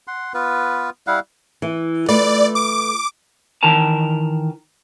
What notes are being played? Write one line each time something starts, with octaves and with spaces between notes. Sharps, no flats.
F#5 C6
B3 F4 B4
G3 E4 F5 F#5
E3
A3 F4 B4 D5
D6
D#3 E3 A#4 A5 A#5